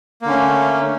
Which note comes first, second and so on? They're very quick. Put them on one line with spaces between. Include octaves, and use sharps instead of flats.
A#3 D3 C#4 A3